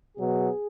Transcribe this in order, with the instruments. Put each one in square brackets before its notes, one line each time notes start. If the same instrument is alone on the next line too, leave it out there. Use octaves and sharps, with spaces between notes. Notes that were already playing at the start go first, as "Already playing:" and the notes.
[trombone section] B2 F#3 B3 G#4